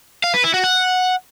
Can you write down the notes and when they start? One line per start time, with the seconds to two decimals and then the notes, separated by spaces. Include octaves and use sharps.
0.24 F5
0.34 B4
0.44 E4
0.54 F#4
0.64 F#5